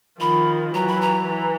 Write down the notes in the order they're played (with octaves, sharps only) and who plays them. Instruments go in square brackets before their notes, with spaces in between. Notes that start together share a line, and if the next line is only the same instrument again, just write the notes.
[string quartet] D#3 F3 [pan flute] B5
[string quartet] E3 F#3 [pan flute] A#5
[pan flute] B5
A#5
[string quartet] E3